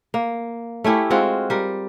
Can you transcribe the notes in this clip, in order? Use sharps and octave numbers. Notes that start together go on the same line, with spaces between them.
A#3
A3 C#4 E4 G4
G#3 C4 F4 F#4
G3 A#4